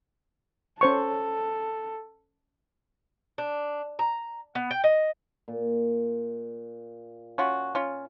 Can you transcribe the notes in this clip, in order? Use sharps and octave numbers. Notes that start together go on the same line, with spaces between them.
C#4 A4 C5 C#6
D4
A#5
B3
G5
D#5
A#2
C#4 F4 F#4
C#4 F4